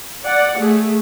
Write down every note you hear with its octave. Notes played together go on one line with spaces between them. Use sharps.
D5 F#5
A3 G#4